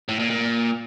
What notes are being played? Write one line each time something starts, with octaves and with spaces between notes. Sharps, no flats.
A2
A#2
A#2